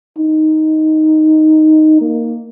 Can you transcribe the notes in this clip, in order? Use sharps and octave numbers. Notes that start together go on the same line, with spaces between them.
D#4
A#3